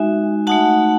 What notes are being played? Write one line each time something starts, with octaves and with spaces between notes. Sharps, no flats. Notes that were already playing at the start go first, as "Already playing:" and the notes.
Already playing: G#3 D#4 F#4 E5 G#5
A3 D#4 F#4 F#5 A5